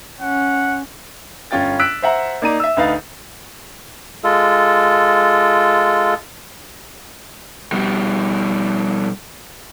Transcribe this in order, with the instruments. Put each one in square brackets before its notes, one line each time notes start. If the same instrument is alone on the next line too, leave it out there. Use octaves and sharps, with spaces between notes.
[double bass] C#4 [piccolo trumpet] F#5
[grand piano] G1 C#4 F4 G5 A6
E6 F#6 B6 D7
C5 E5 F#5 A#5
A#3 D#4 D5 A#5 D#7
E5 E6
D2 D#4 B4 F5 A6
[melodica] G#3 F4 A4
[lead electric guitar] B2 G3